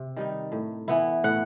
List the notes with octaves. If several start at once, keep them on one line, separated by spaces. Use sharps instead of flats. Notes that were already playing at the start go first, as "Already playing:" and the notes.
Already playing: C3
D#3 G3 D#4
A2
E3 B3 E4
A2 F#5